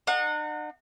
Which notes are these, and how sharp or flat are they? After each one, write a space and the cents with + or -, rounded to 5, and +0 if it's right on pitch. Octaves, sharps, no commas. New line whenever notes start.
D#4 -45 F#5 -20